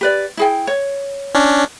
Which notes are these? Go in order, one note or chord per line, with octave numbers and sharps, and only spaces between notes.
G4 B4 D5
E4 G#4 G5
C#5
C#4 D4